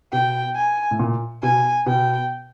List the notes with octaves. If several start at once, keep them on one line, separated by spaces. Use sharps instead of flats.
B2 G5
G#5
A2
A#2
B2 G#5
B2 G5